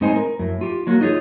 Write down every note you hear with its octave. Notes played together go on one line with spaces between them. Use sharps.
A2 G#3 C4 D#4 C5 G#5
A#4
F#2 A2
F4 G4
F#3 A#3 F#4
D#4 F4 G#4 C#5